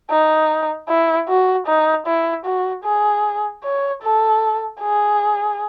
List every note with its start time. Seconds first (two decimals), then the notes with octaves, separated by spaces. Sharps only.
0.10 D#4
0.89 E4
1.29 F#4
1.67 D#4
2.06 E4
2.45 F#4
2.84 G#4
3.64 C#5
4.03 A4
4.80 G#4